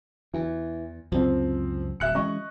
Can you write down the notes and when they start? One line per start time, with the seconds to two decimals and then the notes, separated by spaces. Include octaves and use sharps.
0.34 E2 E3
1.12 C#2 F#2 C3 F3 C4
2.00 D1 E5 F#6 C#7
2.15 E3 G#3 C#4 D#5 C#6